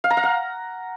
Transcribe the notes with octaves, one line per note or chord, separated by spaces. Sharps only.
F5
A#5
F5
F#5